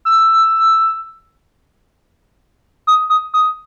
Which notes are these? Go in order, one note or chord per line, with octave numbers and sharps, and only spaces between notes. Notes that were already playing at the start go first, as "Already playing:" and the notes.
E6
D#6
D#6
D#6